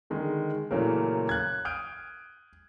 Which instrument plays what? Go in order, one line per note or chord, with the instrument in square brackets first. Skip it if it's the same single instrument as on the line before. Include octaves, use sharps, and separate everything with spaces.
[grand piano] D3 D#3 G#3
A#2 C#3 E3 F#3 A3 A#3
F#6 G#6
D#6 F6 G6 D7